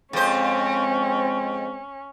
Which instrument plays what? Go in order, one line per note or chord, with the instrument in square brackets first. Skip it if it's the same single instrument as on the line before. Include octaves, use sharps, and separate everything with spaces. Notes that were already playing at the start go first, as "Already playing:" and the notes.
[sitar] F2 C5 [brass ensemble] G#3 C4 [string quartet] C#4